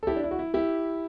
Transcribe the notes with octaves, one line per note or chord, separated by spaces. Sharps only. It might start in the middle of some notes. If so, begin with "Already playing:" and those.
A4
E4 G4
D4
E4
F#4
E4
E4 G4